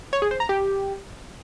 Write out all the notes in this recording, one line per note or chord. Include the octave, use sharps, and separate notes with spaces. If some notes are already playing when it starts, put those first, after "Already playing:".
C#5
G#4
C5
A#5
G4